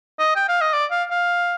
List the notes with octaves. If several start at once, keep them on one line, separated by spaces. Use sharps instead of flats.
D#5
G5
F5
D#5
D5
F5
F5